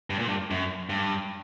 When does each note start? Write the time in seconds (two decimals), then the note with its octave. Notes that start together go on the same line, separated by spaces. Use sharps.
0.10 G2
0.19 A#2
0.28 G2
0.51 F#2
0.89 G2